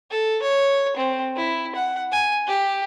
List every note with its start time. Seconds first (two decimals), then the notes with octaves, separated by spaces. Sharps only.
0.11 A4
0.42 C#5
0.97 C4
1.36 E4
1.75 F#5
2.12 G#5
2.47 G4